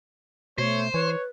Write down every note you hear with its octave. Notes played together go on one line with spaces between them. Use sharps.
B2 A3 C5 C#5
E3 B4 C#5